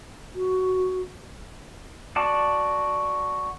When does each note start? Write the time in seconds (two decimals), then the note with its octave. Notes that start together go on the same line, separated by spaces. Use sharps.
0.35 F#4
2.16 F#4 D5 A5